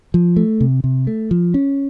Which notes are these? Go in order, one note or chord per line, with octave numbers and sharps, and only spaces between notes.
F3
A3
C3
C3
A3
F3
C#4